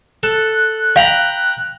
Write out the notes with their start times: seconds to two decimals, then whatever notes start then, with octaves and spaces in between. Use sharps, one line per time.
0.23 A4 F#6
0.96 F5 G5 A#5 B5